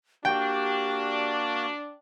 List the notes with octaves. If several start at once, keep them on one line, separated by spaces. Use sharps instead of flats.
A#3 D4 F#4 G4 G5